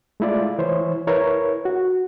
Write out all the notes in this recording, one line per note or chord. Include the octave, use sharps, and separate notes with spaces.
G#3 A3 E4 F4 D5
E3 E4 C5 C#5
E4 A#4 B4 C#5
F#4